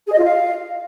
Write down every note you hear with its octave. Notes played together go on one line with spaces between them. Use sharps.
G#4
D#5
F4
F5